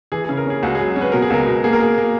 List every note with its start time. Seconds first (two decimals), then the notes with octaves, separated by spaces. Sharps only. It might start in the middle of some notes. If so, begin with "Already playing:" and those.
0.12 E3 G#4
0.24 G#4
0.29 C#3
0.37 A#4
0.46 C#4 G#4
0.63 C#2 F#4
0.75 G#4
0.80 F#3
0.96 C#4
1.01 B4
1.12 B2 A#4
1.22 G#4
1.30 C#2 A#4
1.47 B2
1.64 A#3 G#4
1.73 A#4
1.80 A#3 G#4
1.98 A#3